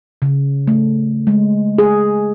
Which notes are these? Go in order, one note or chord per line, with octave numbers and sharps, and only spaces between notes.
C#3
A3
G#3
G#4